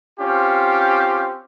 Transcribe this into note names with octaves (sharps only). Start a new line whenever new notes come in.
C4 C#4 F4 G4